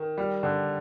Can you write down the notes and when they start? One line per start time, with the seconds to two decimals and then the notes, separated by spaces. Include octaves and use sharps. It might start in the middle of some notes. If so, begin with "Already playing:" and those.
Already playing: D#3
0.18 G3
0.43 D3